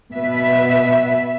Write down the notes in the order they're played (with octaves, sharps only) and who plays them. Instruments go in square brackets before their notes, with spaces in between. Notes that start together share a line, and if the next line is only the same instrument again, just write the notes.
[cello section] B2 B4 E5